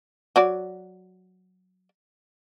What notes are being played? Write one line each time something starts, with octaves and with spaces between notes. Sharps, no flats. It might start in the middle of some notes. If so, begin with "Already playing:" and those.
F#3 F#4 D5